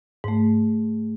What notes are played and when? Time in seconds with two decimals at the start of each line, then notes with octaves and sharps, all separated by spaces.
0.24 G#2 A3